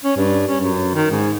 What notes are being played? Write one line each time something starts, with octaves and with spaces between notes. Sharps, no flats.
C#4
G2
C#4
F#2
D#3
G#2